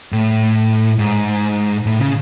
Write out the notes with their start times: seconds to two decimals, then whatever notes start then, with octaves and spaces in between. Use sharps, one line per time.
0.13 A2
0.99 G#2
1.86 A2
1.99 C#3